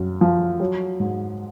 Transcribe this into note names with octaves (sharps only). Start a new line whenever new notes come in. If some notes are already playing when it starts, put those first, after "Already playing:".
Already playing: F#2
F3
F#3
G#2